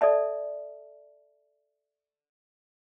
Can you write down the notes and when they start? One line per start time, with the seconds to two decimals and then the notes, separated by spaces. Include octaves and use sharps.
0.01 A4 D5 E5 A5